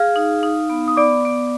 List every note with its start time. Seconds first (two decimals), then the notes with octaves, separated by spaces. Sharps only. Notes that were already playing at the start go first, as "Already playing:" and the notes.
Already playing: G#4 F5 F6
0.16 D#4
0.43 D#4
0.70 B3
0.88 D#6
0.97 B3 D5 D6
1.25 B3